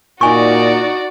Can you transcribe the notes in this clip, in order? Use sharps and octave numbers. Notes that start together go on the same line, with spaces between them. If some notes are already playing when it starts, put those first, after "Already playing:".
A#2 D#4 F#4 D5 G#5 C#6